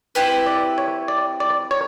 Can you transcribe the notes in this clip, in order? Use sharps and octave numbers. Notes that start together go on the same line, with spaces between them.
C4 E4 G4 B4
D5
C#5
D5
D5
C#5